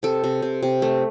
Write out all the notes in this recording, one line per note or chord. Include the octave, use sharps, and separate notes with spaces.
C3 A4
C3
C3
C3
A3